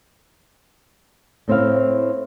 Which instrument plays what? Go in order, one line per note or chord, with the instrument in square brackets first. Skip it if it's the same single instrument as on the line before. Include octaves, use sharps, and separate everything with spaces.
[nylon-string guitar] A2 C4 E4 F5